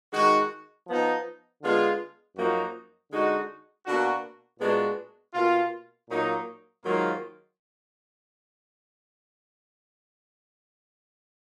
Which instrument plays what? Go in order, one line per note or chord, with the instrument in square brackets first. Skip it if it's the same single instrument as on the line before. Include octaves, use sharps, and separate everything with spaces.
[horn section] D#3 G#3 D#4 F#4
F3 B3 D#4
D3 G#3 B3 F4
F#2 F3 A#3 D#4 F#4
D3 G#3 D#4 F#4
B2 A#3 D4 F#4
A#2 G#3 B3 D4 F#4
B2 A#3 F4
A#2 F#3 A#3 D#4
G#2 D#3 F#3 A#3 F4